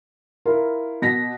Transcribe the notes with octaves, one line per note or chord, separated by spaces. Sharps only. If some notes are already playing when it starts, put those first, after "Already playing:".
E4 F4 A#4
B2 A#6 B6